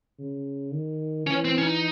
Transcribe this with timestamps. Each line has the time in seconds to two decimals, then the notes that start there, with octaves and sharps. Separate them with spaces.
0.19 C#3
0.73 D#3
1.27 E3 C#4
1.45 C4
1.58 C#4
1.63 D#4